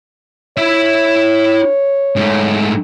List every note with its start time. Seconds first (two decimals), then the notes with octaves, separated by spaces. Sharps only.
0.58 E4 C#5 E5
2.16 G#2 A3